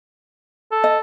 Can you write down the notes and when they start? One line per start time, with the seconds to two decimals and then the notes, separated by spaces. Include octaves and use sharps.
0.72 A4
0.84 D#5